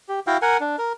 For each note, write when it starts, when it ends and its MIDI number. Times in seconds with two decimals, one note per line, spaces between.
0.09 0.20 67
0.27 0.37 64
0.27 0.37 66
0.27 0.37 77
0.27 0.37 79
0.42 0.57 70
0.42 0.57 78
0.42 0.57 80
0.60 0.76 62
0.78 0.93 70